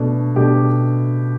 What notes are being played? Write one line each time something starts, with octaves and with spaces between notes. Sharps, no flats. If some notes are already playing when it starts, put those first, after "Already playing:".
Already playing: B2 A3 D4
B2 A3 D4 G4